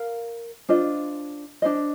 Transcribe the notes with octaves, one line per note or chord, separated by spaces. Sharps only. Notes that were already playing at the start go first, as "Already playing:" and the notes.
Already playing: A#4 F5
D4 F4 C5 D#5
D4 F4 C5 D#5